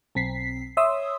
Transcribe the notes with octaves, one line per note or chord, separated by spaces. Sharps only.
B1 C4 B6 C7
C#5 E5 C6 D#6 E6